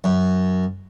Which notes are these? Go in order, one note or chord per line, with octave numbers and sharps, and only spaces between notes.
F#2